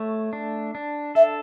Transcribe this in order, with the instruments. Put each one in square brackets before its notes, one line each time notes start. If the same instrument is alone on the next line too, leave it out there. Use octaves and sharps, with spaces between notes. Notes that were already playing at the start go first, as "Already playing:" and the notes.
Already playing: [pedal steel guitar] A3 C#5
D4
D4
[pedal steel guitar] A4 [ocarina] E5